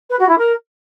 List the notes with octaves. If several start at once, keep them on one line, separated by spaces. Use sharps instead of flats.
B4
F#4
E4
A#4